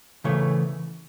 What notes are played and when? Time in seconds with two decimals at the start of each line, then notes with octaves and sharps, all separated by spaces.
0.24 C#3 E3 A3 C#5